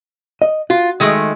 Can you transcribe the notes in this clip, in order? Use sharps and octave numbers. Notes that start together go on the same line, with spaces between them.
D#5
F4 F#4
D#3 G#3 A3